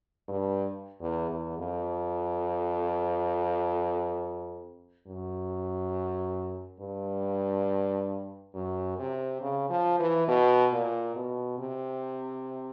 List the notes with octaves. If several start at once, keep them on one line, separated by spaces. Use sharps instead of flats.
G2
E2
E2
F2
F#2
G2
F#2
C3
C#3
F3
E3
B2
A#2
B2
C3